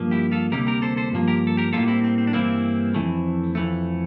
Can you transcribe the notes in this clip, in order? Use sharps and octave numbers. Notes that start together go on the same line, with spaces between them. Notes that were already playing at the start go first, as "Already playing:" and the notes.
Already playing: G2 F3 A#3
E4 G4
F4 A4
D2 C3 G3 A#3 G4 A#4
G4 A#4
A4 C5
A4 C5
G2 F3 A#3
G4 A#4
A4
G4 A#4
A2 G3 A#3 F4 A4
C4 E4
C4
C4
D4
G2 E3 A#3 C4 E4
F2 E3 A3
F2 E3 A3